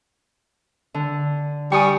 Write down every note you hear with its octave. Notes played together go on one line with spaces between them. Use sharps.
D3
G3 G5 G#5 C#6 D#6